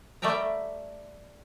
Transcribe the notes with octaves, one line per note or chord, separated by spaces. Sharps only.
G3 A3 D5 E5 G5 A#5